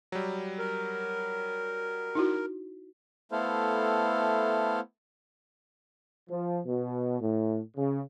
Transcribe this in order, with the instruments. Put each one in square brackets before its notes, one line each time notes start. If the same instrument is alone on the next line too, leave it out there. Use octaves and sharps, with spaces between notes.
[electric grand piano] F#3 G3
[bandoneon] A#4
[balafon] D#4 E4 F#4
[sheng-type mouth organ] A3 B3 E4 A4 C5 F5
[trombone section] F3
B2
A2
C#3